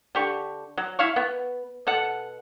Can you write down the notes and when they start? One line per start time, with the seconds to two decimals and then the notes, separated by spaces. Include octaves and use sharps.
0.15 D3 G4 C#6
0.77 F#3
0.99 E4 E5 F5 C#6
1.16 B3
1.87 B2 A4 F#5